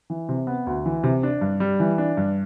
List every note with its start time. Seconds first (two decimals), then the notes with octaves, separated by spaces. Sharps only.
0.10 E3
0.29 C3
0.47 B3
0.67 D2
0.86 E3
1.03 C3
1.23 D4
1.41 G2
1.60 G3
1.80 E3
1.98 D4
2.17 G2